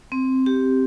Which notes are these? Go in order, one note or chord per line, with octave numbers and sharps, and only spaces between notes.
C4
G4